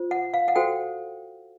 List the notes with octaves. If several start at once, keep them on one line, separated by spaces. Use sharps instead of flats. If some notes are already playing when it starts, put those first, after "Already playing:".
Already playing: F4 C5
F#5
F5
F#5
F#4 A4 C5 G5